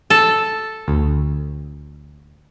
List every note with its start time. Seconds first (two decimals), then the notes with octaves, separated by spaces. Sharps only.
0.10 A4
0.88 D2